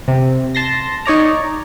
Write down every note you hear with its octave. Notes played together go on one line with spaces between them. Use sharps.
C3
A5 C6 A#6
D#4 C#5 D5 A#5